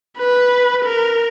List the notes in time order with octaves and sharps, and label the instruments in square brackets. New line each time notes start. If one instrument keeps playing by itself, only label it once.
[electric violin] B4
A#4